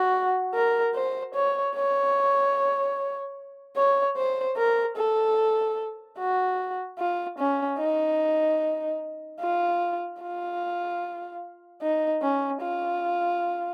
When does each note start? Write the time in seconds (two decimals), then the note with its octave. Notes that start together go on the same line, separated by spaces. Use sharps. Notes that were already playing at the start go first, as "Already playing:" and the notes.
Already playing: F#4
0.54 A#4
0.95 C5
1.34 C#5
1.75 C#5
3.76 C#5
4.17 C5
4.57 A#4
4.97 A4
6.18 F#4
6.99 F4
7.39 C#4
7.79 D#4
9.40 F4
10.21 F4
11.82 D#4
12.22 C#4
12.62 F4